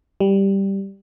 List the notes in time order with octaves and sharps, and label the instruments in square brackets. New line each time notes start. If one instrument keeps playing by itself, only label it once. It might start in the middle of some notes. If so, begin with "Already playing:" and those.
[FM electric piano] G3